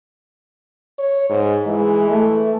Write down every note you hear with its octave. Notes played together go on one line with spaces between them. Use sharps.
C#5
G#2
E3 G#3
A3